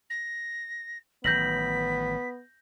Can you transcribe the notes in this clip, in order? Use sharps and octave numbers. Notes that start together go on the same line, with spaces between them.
A#6
A1 D#3 F#3 B3 G6 A#6 B6 F#7